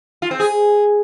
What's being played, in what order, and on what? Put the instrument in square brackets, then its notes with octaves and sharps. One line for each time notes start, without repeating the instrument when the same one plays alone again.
[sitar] F4
C4
G#4